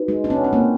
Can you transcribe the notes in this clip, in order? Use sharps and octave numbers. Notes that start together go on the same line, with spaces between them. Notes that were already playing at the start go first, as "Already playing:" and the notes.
Already playing: D#4 F#4 B4
G#3
D4
B3 C#4
C#4
A#3 C4